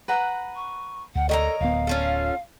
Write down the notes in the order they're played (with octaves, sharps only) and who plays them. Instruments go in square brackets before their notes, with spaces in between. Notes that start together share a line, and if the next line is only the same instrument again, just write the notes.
[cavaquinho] B4 F#5 A#5
[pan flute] C#6
[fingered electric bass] D2 [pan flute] F#5
[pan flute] A4 [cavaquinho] A#4 C#5 [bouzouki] D#5 G5 A#5
[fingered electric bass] D1 B3 [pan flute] F5
[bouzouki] C#4 F4 A4